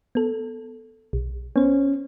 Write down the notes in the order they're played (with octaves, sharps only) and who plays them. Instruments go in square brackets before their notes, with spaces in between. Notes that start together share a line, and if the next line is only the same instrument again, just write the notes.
[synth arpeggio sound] B3 A4
B1
[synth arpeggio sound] B3 C5 [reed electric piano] C#4